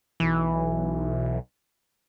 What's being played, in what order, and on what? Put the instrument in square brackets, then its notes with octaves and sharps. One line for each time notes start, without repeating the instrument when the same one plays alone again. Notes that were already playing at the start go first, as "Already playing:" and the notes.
[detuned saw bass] B1 [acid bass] E3